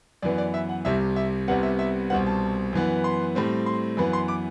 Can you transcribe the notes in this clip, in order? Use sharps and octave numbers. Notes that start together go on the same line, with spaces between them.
F#2 E3 B3 D5
D5
E5
F#5
C2 C3 G3 E5
E5
C2 C3 G3 B3 F#5
E5
E5
C2 B2 G3 C4 F#5
A5
F#2 E3 B3
C6
A2 G3 C4
C6
F#2 E3 B3 B5
C6
D6